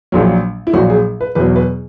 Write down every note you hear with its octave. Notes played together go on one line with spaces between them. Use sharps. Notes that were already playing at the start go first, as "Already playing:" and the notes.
A#1 A#2 F#3
E4
A#1 A#2 F#3 F#4
G#4
B4
E2 B2 F#3 B4
B4